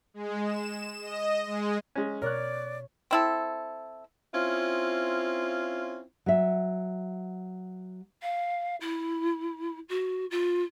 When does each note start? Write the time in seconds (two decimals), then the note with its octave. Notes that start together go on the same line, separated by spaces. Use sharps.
0.14 G#3
0.44 E7
1.01 D#5
1.47 G#3
1.95 G#3 C#4
2.22 B2 A#4 C#5 D5 F#6
3.11 C4 E4 A4
4.35 C4 C#4 E4 F4
6.26 F#3 E5
8.22 F5
8.80 E4
9.89 F#4
10.30 F4